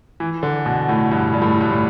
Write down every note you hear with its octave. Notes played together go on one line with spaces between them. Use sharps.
E3
D3
B2
A2
G2
G2
A2
G2
A2